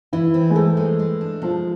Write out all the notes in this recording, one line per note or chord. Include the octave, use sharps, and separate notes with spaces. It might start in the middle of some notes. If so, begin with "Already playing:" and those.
E3 E4
C4
G#3
E3 A3
G#3
G#3
D4
F3 G#3